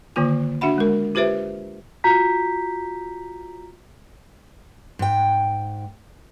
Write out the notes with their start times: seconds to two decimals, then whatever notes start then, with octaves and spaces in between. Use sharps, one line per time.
0.16 D3 D#3 A#3 F4 G#5
0.61 D4 F#4 E5 F#5 B5
0.78 G#3 A#4
1.15 F4 G4 B4 C5 E5
2.04 F4 F#4 A#5 G6 B6
4.99 G#2 G5